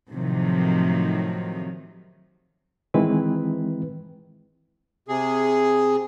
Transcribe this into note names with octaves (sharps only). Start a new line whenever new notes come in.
A2 C3 D#3 F3 F#3
D#3 E3 G#3 C4 E4 B4
C3 G#4